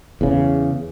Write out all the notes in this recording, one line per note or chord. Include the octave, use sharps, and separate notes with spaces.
E2 C#3